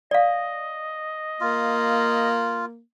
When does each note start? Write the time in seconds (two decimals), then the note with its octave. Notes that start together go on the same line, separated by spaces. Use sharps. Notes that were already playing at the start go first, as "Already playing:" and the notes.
0.11 D5 D#5 F5
1.41 A#3 F4